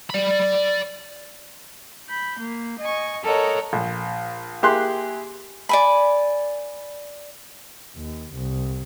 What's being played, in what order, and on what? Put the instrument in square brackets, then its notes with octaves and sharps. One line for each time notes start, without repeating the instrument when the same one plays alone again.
[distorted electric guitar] D5 B5
[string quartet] B5 G6
A#3
D#5 G#5 C#6
A4 A#4 C#5 D#5 F#5
[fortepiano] A#1
A#3 E4 G4 G#4 C6 F#6
[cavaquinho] D5 G#5 B5
[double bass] D#2
C2